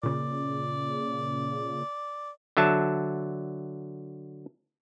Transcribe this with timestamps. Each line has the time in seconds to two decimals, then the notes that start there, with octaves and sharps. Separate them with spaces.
0.03 A#2 C#3 D5
2.57 D3 F#3 E5 A5